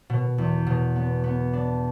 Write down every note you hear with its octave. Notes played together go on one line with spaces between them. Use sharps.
B2
E2
B2
B3
B3
D4